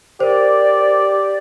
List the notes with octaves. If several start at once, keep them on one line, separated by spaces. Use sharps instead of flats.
G4 A#4 C5 D5